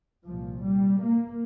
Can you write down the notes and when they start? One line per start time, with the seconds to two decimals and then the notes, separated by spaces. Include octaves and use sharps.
0.25 C2 A#2 F3
0.62 G3
1.00 A#3